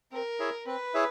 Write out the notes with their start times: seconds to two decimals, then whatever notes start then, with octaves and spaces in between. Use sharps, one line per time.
0.12 C4 A#4
0.39 E4 G#4 C#5 E5
0.66 C4 B4
0.94 E4 G#4 C#5 E5